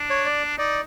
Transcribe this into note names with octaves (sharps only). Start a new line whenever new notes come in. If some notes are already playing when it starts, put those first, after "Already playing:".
Already playing: D4
C#5
D5
D#4 D5